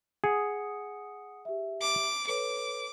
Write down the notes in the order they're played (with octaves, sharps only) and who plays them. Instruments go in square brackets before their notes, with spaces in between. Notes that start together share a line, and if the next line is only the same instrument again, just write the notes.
[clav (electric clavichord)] G#4 [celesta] F#5 D#6 C#7
[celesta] G4 E5
[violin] D6
[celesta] A4 B4 C#5 [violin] D6